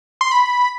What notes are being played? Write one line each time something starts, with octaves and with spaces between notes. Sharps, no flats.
C6
B5